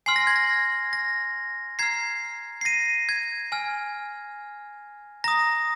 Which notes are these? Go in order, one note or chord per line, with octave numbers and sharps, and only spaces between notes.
G#5 C6 F6 C7
A#6
G#6
A#6
A#6
A#5 F6 G#6 C7
C7
A#6 D#7
G#6
G#5 F6
A#5 D#6 A#6